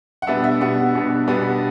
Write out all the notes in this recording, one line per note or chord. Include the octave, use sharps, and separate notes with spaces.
F#5
B2 G3 B3 D4 E5
E5
B2 G3 B3 D4 F#5
B2 G3 B3 D4
B2 G3 B3 D4